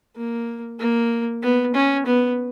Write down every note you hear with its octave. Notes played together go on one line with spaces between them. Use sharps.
A#3
A#3
B3
C#4
B3